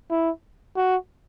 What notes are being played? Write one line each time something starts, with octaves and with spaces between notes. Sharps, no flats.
E4
F#4